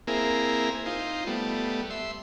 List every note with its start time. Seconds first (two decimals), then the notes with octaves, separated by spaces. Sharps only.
0.07 A#3 C4 E4 G#4 A#4
0.86 D#4 F4 C5
1.27 G3 A3 B3
1.90 E5 C6